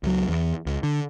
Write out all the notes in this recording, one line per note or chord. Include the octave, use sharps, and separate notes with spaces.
C#2 F#3
E2
C#2
D3